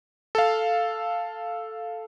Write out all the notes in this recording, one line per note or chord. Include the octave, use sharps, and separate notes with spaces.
A4 F5